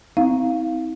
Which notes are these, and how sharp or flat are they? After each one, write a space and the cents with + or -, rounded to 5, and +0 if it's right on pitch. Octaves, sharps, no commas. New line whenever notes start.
C4 -15 E4 -45 F5 +0